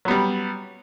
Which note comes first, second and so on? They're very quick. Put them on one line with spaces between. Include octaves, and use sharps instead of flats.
F#3 B3 G3